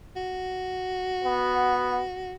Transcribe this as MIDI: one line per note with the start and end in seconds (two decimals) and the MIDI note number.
0.16 2.34 66
1.24 2.00 59